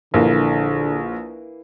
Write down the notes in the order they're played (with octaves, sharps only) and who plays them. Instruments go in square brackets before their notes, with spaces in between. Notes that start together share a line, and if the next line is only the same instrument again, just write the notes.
[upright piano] A#1 [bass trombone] D3 [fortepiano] E3 A#3